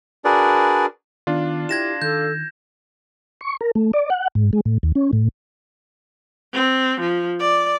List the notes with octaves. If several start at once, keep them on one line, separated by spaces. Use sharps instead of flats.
D4 F#4 G#4 A#4 B4 D5
D#3 B3 D4 F4
E4 G4 G#6 A#6 E7
D#3 A4 G6
C#6
A#4
A3
D5
F#5
G#2
G#3
A2
D#2
C#4
A2
C4
F3
D5